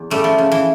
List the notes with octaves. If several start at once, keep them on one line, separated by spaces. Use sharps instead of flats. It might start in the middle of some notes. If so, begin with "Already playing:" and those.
Already playing: E2
C#3 G3 A3
F3
C#3
E3